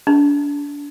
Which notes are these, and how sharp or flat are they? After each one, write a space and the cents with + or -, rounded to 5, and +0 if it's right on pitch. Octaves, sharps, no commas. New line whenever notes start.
D4 -30